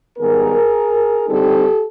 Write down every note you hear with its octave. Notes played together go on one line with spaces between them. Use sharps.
G#2 D#3 G3 B3 G#4 A#4
D3 G3 C4 D#4 G4 A4